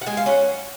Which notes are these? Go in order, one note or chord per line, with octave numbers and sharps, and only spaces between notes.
F#5
G#3 G#5
F5
C#4 F#5